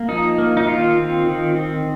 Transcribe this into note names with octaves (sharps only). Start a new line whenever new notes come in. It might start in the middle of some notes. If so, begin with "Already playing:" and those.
Already playing: A#3
F3 D#4
A#3
D#4
D#3 F4
C4
D#3
C4